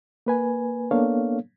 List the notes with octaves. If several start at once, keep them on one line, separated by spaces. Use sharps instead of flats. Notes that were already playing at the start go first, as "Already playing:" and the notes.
A#3 B4 G#5
A#3 B3 D4 A4 C#5 F5